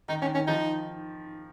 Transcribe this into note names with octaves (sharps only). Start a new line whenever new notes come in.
D#3 D#4
D#3 C#4
D#3 C#4
F3 D#4